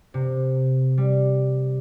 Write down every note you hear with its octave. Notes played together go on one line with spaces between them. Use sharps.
C3
G3